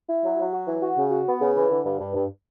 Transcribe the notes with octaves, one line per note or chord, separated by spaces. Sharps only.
E4
F#3
F#3
F#4
E3
F#4
C#3
F#4
B3
C#3
E3
D3
G2
G2
G2